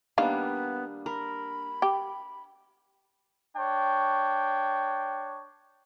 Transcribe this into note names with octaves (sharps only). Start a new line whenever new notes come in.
D#3 G3 A#3 B3 D4 F5
A#4 B5
G4
D4 C#5 G5